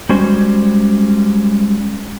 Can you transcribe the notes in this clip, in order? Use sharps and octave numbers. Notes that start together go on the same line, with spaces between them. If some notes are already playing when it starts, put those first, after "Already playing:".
G3 G#3 C#4 F#4 C5